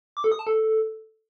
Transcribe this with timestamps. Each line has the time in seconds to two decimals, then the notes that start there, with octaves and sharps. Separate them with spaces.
0.17 D6
0.24 A4
0.32 D#6
0.39 A5
0.47 A4